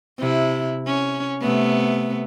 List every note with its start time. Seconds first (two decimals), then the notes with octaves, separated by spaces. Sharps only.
0.19 C3 E4
0.87 C#4
1.42 C3 A3 B3